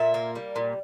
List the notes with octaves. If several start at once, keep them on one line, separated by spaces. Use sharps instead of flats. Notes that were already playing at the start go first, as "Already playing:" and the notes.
Already playing: A#2 E5
A#3
G3
A#2